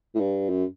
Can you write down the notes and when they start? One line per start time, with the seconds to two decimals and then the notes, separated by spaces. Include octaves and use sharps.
0.15 A2
0.20 G2
0.49 F#2